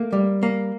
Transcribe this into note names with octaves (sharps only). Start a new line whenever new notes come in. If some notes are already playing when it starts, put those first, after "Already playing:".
Already playing: A3 A#3
G3
A#3